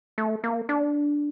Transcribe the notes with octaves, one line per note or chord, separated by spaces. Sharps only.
A3
A#3
D4